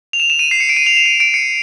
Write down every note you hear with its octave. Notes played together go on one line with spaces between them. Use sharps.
F7
E7
E7
D#7
C7
C#7
D7
D#7
F7
E7
D#7
D7
C#7